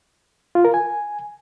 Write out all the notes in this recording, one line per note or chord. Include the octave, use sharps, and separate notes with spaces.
F4
A#4
G#5